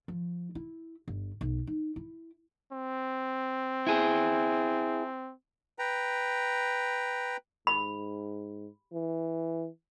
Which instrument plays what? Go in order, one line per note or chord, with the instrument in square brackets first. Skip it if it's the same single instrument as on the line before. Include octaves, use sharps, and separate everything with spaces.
[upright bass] F3
E4
G1
B1
D#4
E4
[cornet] C4
[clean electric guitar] E4 G#4
[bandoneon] B4 G5 A#5
[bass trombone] G#2 [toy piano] B5
[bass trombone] E3